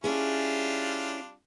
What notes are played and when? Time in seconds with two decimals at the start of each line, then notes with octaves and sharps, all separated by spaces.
0.04 G3 C#4 D4 E4 F4 G#4